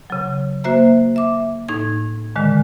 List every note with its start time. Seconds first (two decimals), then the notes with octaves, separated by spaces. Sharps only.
0.10 C#3 F#3
0.64 A#3 F#4 C5 E5 A#5
1.16 E5 D6
1.69 A2 D#4 G#6
2.36 A#2 D3 D#3 G#3